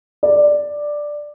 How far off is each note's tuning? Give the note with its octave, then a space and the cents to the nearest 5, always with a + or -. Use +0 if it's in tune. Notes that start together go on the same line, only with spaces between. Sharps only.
D5 +5